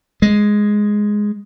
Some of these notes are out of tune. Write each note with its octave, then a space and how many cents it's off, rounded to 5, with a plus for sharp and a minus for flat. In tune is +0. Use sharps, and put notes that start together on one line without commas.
G#3 +0